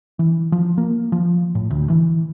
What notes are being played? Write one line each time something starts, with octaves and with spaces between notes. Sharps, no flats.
E3
F3
A#3
F3
A2
D2
E3